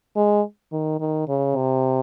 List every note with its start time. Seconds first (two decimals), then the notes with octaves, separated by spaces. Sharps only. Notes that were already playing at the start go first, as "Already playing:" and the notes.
0.16 G#3
0.72 D#3
1.00 D#3
1.28 C#3
1.56 C3